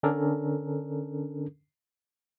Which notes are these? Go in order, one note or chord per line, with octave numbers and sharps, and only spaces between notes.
D3 C#4 D4 A4 A#4